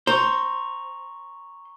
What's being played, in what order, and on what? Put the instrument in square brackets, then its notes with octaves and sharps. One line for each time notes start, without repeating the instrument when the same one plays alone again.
[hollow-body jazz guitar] C5 [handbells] A#5 C#6